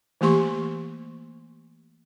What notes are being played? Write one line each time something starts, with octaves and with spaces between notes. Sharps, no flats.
E3 A3 A#3 G4 C6 C#6